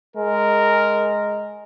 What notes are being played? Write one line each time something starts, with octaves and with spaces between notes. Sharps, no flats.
G#3 A#4